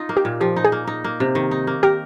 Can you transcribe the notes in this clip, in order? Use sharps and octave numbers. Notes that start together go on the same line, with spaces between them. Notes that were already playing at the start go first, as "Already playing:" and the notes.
Already playing: D#4 F4
A#3
G4
A#2
F3 G4
D#4
G#4
A#3
D#4
A#3
C3
D#3
D#4
A#3
G4 A#4